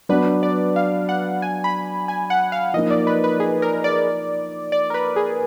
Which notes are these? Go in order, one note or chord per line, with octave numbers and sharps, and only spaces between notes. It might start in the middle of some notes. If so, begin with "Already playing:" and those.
F#3 B3 D4 B4
D5
F5
F#5
G#5
B5
G#5
F#5
F5
F3 A#3 D#4 D#5
D5
B4
B4
G#4
A#4
D5
D5
A#4
B4
G#4